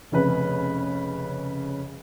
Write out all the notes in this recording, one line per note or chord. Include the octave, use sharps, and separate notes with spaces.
F1 C#3 B4